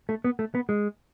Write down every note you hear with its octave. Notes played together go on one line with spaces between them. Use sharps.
A3
B3
A3
B3
G#3